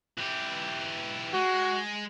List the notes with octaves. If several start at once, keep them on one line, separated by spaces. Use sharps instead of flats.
E3 G4
G#3 F#4